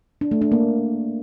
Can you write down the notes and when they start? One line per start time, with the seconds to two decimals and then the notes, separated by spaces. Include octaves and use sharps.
0.21 D4
0.31 A3
0.42 D4
0.52 A#3